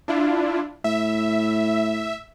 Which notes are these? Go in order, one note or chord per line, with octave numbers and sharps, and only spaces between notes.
D4 E4 F4
A2 E5